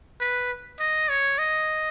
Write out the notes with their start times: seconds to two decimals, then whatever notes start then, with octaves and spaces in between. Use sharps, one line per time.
0.20 B4
0.80 D#5
1.10 C#5
1.39 D#5